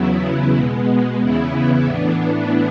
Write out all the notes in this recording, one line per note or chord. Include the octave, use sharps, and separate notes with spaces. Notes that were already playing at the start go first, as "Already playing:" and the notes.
Already playing: E2 C#3 F#3 B3 E4
B2 G#3 B3
E2 C#3 E3 B3 E4
A2 E3 B3 D4